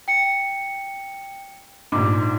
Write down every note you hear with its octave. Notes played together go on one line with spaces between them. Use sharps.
G5 C#7
A#1 G#2 D6